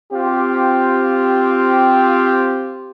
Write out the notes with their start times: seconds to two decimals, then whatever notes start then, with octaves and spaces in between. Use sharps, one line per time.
0.12 C4 F4 G4